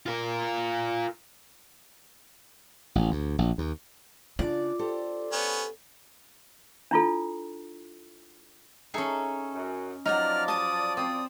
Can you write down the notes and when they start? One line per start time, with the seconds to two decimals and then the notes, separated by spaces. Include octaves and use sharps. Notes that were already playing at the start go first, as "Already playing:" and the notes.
0.06 F4 A#4
2.95 A1
3.11 D2
3.38 A#1
3.58 D#2
4.39 C#3 D4 F4 D5
4.79 G4 A4 C5
5.32 B3 C#4
6.91 D4 E4 F4 A4
8.94 C#4 D#4 G#4 A4 E5
9.54 F#2
10.06 F3 F#3 D#4 D5 F#5 F6
10.48 A5 D#6
10.97 C4 D#6